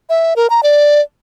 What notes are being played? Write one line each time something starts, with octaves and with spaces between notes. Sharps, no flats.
E5
A#4
A#5
D5